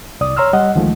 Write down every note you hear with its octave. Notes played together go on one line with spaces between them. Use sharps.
C2 D5 D#6
C#5 A#5 C6 E6 F6
G3 D#5 F#5
D2 D#3 F3 G#3 A3